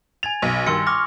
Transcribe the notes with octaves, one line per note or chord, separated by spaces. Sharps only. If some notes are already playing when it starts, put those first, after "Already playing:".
G#5 G#6 A6 F7
B1
G2 D#3 C6 E6 C#7
C#6 D6 F6 A#6